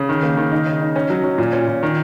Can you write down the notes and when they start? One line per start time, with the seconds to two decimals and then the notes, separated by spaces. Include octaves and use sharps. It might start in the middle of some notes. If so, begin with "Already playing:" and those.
Already playing: C#3
0.09 D#3
0.23 A#3
0.37 D#3
0.52 D#4
0.66 C#3
0.81 D#4
0.96 C#4
1.10 F#3
1.24 F#3
1.38 A#2
1.53 C#4
1.68 A#2
1.83 D#3